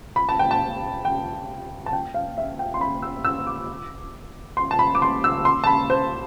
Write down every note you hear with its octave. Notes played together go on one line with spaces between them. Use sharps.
B5
A5
G5
A5
G5
A5
G5
F5
E5
G5
C6
B5
E6
E6
D6
C6
A5
B5
D6
C6
E6
C6
A5
B5
C5